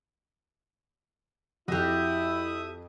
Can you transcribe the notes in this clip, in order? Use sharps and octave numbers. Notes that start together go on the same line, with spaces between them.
F2 E4 F#4 G4 E5 D#6